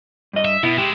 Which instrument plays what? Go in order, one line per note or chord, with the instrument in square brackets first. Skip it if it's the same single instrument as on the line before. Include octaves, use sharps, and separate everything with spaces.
[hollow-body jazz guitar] G2 D#5
[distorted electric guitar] E5
[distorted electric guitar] B2 B3 [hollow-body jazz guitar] E4
[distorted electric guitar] G#3 E4 [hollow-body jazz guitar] G4